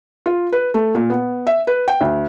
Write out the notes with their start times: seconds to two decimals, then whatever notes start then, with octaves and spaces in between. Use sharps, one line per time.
0.26 F4
0.52 B4
0.74 A3
0.95 A#2
1.10 B3
1.47 E5
1.67 B4
1.88 G5
2.01 D2